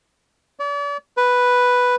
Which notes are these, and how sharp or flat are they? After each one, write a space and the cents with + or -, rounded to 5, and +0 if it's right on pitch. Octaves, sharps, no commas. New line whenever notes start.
D5 -40
B4 +0